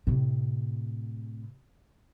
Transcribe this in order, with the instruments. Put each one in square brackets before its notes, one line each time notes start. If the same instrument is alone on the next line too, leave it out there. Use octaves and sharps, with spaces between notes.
[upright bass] A2 C3